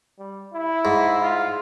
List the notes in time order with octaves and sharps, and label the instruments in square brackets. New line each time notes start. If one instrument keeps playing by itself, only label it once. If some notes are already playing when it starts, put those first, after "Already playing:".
[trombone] G3
E4
[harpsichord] G#2
[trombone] F4